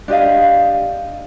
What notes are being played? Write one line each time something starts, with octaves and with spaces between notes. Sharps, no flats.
D4 G4 D#5 F5